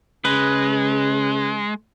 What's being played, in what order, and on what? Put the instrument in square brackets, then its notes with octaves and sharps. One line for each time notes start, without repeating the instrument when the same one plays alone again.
[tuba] C#3 [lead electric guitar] G#3 [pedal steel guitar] B4